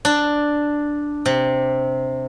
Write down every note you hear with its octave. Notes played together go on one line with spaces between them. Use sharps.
D4
C3